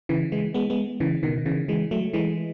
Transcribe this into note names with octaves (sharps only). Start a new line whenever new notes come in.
C#3 E3
E3 G#3
G#3 B3
G#3 B3
C#3 E3
B2 D#3
D#3
C#3 E3
E3 G#3
F#3 A3
E3 G#3